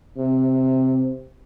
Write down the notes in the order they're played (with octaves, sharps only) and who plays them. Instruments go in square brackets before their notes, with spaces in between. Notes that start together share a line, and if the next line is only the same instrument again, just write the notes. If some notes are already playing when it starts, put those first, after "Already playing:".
[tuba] C3